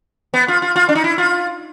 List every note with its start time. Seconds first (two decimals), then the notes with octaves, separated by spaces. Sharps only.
0.34 B3
0.48 F4
0.62 F4
0.76 F4
0.89 D4
0.95 D#4
1.04 E4
1.18 F4